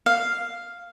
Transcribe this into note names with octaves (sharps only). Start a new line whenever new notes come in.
F5